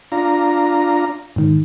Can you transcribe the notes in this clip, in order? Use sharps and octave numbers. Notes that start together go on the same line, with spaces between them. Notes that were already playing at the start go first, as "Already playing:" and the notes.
D4 F4 A#5
G#2 D#3